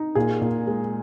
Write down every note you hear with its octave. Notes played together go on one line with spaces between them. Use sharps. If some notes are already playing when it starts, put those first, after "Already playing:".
Already playing: D#4
A#2 G#4
A#2
G#3